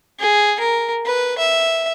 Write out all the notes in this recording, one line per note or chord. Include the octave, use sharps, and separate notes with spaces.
G#4
A#4
B4
E5